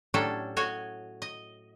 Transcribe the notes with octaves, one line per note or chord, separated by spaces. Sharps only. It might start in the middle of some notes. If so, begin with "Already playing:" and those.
A2 F#3 C#4 D4 G4 A4
A2 F#4 C#5 D#5 G#5
D#5